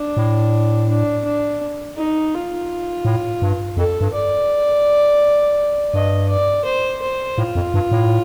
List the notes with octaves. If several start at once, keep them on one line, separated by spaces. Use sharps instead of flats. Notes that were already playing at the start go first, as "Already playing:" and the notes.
Already playing: D4
A2
D4
D4
D#4
F4
A2
G2
F2 A4
G2
D5
G2 D#5
D5
C5
C5
A2 F4
F2
G2
A2